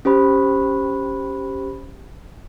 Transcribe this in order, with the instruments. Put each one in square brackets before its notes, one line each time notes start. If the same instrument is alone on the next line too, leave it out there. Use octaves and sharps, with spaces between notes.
[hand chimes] C#4 G4 C5 B5